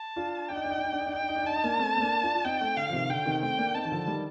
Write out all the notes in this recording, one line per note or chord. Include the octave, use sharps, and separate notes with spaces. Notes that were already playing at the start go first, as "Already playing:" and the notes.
Already playing: A5
D4 F4
D4 G5
D#4
D4
D#4
D4
D#4
D4
D#4
D4
D#4 G5
D4
D#4
D4
D#4
D4 A5
D#4
A#3 D4
A3 C4
C4
A#3 D4
D4 F4
F4
C4 D#4 G5
A3 C4
D3 F5
F3
C3 D#3
D3 G5
C3 D#3
A3 C4 G5
A#3 D4
C4 D#4 A5
D#3
D3 F3
D#3 G3